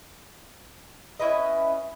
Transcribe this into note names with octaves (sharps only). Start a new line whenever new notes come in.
C#4 E4 B4 D#5